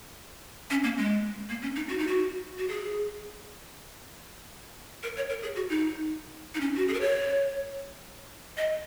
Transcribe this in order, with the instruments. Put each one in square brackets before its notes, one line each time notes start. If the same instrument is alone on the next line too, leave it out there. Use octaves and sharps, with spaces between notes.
[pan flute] C#4
A#3
G#3
A#3
C#4
D#4
F#4
D#4
F#4
F#4
G#4
A#4
C#5
A#4
G#4
F#4
D#4
D#4
C#4
F#4
G#4
A#4
C#5
D#5